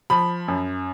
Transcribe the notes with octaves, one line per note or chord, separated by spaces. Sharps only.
F3 B5
F#2